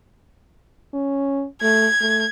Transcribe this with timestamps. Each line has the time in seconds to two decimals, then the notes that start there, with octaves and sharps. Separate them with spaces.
0.94 C#4
1.62 A3 G#6
2.01 A3